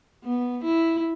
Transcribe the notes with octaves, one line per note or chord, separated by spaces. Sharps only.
B3
E4